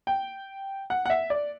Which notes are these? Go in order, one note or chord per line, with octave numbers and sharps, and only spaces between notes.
G5
F#5
F#5
E5
D5